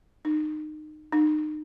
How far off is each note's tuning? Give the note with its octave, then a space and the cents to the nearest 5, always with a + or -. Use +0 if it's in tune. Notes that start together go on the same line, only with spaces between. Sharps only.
D#4 -25
D#4 -30